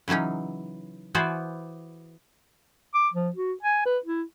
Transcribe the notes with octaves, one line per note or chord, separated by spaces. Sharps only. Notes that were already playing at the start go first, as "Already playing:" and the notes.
C#3 E3 F#3 C#4 D#4
E3 B3 F#4 G#4 C5 D5
D6
F3
F#4
G#5
B4
E4